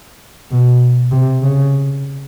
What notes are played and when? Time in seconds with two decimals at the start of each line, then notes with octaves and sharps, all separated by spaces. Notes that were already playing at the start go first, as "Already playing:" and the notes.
0.51 B2
1.11 C3
1.42 C#3